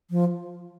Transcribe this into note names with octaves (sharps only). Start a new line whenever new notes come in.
F3